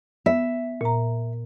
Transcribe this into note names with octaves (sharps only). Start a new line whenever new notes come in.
B3 E5
A#2 A#5